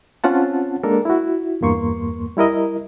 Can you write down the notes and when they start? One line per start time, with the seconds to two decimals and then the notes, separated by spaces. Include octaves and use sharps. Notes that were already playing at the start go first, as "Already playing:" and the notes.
0.24 C4 C#4 F4 F#5 A5
0.83 G#3 A#3 D4 A4 A#4
1.05 E4 F#4
1.61 E2 G2 A#3 C6 C#6
2.37 G3 E4 A#4 D#5